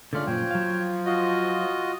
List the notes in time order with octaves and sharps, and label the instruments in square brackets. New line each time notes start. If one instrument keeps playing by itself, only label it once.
[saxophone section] G#2 C#4 F4 [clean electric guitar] D3 A3 D5
[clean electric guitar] F#2 A#2 [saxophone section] F3 [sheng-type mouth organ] C#5 G5
[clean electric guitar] F#3 F5
[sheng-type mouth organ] F4 F#4 D#5